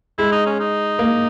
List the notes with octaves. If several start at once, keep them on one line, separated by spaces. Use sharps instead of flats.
G#3 E4
D#4
C#4
D#4
A#3